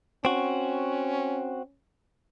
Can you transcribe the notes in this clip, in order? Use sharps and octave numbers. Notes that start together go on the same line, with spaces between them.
C4 C#4 F#4